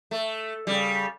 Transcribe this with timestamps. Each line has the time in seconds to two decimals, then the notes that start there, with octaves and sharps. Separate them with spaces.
0.11 A3
0.67 C#3 G3